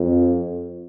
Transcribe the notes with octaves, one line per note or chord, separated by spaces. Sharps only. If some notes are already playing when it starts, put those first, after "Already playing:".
Already playing: F2